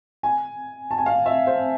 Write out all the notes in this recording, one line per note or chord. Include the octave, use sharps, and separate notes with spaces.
G#5
A5
G#5
F5
E5
C5